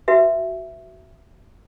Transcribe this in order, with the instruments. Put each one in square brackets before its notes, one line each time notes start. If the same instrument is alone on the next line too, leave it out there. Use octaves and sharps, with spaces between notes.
[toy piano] F#4 B4 E5